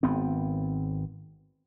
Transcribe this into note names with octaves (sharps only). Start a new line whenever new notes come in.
G#1 B3 C4